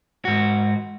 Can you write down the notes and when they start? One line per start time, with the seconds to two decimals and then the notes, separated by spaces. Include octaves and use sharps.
0.25 G#2 F#4